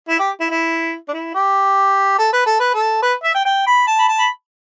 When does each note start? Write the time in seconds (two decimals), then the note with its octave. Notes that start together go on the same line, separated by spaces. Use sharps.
0.08 E4
0.19 G4
0.40 E4
0.50 E4
1.08 D4
1.13 E4
1.34 G4
2.18 A4
2.33 B4
2.46 A4
2.60 B4
2.74 A4
3.02 B4
3.24 E5
3.34 G5
3.45 G5
3.66 B5
3.87 A5
3.98 B5
4.08 A5
4.19 B5